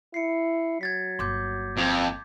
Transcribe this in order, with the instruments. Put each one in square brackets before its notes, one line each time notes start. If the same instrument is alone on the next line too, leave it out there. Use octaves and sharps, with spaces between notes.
[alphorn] E4 [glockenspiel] C7 C#7
[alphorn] F#3 [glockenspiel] G#6 A6 B6
[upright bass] G1 A#3 [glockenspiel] C6 D6 G6
[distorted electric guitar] F2